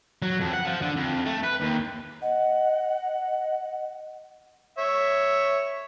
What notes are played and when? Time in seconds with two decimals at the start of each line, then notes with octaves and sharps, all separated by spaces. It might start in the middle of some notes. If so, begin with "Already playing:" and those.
0.22 F#3
0.40 F2
0.54 F#5
0.66 F3
0.82 D3
0.96 F2
1.26 A3
1.43 B4
1.60 D#2
2.22 D#5 F#5
4.78 C#5 E5